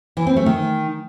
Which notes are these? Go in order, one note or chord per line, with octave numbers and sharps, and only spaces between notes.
E3
C4
A3
D#3